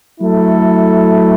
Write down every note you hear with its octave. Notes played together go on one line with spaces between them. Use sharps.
F#3 A3 E4 A4